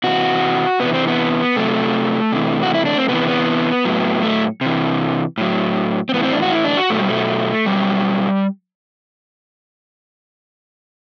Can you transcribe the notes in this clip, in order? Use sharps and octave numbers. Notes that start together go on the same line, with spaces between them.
C3 E3 F#4
C3 E3 B3
C4
B3
C3 F#3 A3
C3 E3
F#4
E4
D4
C4
C3 E3 B3
B3
A2 F#3
A3
C3 E3
A2 F#3
C4
A2 E3 B3
C4
D4
F#4
E4
D4
F#4
B2 F#3 A3
G3
A3
B2 F#3 G3